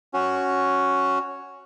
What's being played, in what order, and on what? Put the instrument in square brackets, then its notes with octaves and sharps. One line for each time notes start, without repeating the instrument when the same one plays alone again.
[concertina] C#4 F#4